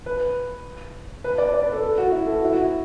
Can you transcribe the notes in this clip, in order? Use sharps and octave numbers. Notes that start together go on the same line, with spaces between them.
B4
B4
D5
D5
B4
A4
A4
F#4
E4
A4
F#4
E4
F#4